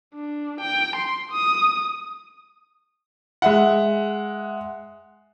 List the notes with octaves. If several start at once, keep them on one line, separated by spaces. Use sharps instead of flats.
D4
G5
C6
D#6
G#3 E5 F#5